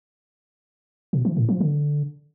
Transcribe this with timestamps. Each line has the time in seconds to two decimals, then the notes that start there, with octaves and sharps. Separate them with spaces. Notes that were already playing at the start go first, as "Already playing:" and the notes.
1.13 B2
1.25 E3
1.37 A2
1.49 F3
1.60 D3